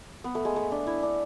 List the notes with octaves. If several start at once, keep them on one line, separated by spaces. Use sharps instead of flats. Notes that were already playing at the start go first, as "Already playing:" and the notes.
B3
A3
G#3
A3
D4
E4
D4